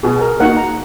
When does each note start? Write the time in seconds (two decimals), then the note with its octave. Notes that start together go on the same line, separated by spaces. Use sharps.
0.03 B2 G#4
0.21 A#4
0.40 A#3 D#4 F#4 F#5
0.57 A#5